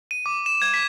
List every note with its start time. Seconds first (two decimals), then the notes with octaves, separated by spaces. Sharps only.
0.11 D#7
0.26 D6
0.46 E7
0.62 G#6
0.74 B6